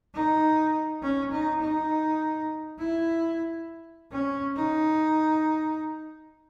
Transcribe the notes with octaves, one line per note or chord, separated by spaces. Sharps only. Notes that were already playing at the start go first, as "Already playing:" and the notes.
D#4
C#4
D#4
D#4
E4
C#4
D#4